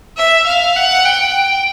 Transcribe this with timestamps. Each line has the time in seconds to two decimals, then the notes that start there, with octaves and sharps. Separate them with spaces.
0.17 E5
0.47 F5
0.76 F#5
1.06 G5